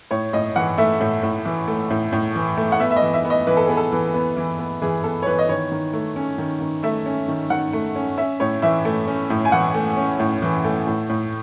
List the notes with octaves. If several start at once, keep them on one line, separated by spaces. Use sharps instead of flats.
A2 C#5
A2 D#5
E3 F#5
A3 E5
A2
A2
E3
A3
A2
A2
E3
A3
F#5
B3 E5
E5
D#5
E3
E5
B3
D#5
E3 B4
A4
B3 G#4
A4
E3
B3
E3
B3
E3 G#4
B3 A4
C#5
E3 B4
D#5
D#3 C#5
D#3
A3
C#4
D#3
D#3
A3 E5
C#4
D#3
D#3 F#5
A3
C#4
C#4 E5
A2 C#5
E3 E5
A3
C#4
A2
G#5
E3 F#5
A3
C#4
A2
E3
A3
A2
A2